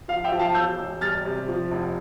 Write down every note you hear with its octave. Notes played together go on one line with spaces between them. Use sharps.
F3 F5
E5 G5
F3
F5 A5
E1 E6 G6
E1
G3 F6 A6
C3
F3
F1